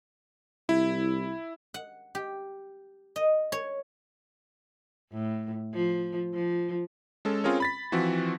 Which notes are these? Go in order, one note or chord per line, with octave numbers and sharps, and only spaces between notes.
C2 E4
F#5
G4
D#5
C#5
A2
F3
F3
G#3 C#4 A4
C4 C#4 F4 G#4 A#4 C#5
B5 A6 B6
E3 F3 C4 F#4